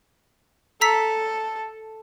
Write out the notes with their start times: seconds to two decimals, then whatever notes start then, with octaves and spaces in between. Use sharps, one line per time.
0.81 A4 A#5 E6 B6